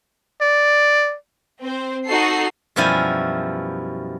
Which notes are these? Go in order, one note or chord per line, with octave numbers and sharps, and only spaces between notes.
D5
C4 C5
D#4 F#4 A4 C7
F#2 B2 F3 G3 E4 G#5